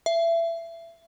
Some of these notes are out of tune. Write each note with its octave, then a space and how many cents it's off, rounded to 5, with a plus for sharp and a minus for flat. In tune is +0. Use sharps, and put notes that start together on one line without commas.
E5 +25